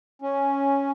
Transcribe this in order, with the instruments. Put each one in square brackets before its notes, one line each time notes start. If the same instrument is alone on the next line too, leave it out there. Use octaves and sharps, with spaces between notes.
[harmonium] C#4